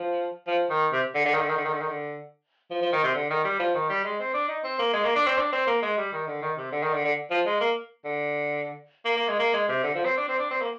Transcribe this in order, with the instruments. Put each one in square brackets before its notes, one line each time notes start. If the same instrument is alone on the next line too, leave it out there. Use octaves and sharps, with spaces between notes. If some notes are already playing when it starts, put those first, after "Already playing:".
Already playing: [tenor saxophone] F3
F3
D#3
C3
D3
D3
D#3
D3
D#3
D3
D#3
D3
D#3
D3
F3
F3
D#3
C3
D3
D#3
G3
F3
D#3
G3
G#3
C4
D4
D#4
C4
A#3
G#3
A#3
D4
C4
D4
C4
A#3
G#3
G3
D#3
D3
D#3
C3
D3
D#3
D3
D3
F3
G#3
A#3
D3
A#3
A#3
G#3
A#3
G#3
C3
D3
F3
C4
D4
C4
D4
C4
A#3